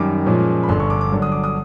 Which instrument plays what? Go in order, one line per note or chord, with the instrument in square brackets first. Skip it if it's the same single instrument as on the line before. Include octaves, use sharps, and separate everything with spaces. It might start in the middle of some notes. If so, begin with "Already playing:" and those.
Already playing: [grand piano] F#2 D#3 G3 D6
A#2 F3 G#3 C#4
B5
G1 G2 D3 C6
C#6
D6
D6
G2 D3 F#3
D#6
D6
D#6